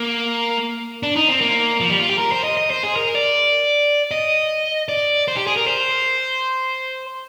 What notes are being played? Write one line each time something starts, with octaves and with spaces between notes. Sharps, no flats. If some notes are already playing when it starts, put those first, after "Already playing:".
Already playing: A#3
D4
D#4
C4
A#3
F3
G3
F4
G4
A#4
C5
D#5
D#5
C5
G#4
A#4
D5
D#5
D5
C5
G4
G#4
A#4
C5